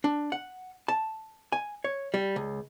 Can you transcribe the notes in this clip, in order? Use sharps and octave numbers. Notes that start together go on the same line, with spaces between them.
D4
F#5
A5
G#5
C#5
G3
C#2